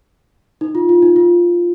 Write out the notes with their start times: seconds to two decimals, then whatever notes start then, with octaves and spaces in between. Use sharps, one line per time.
0.61 D#4
0.75 F4
0.89 F4
1.03 D#4
1.16 F4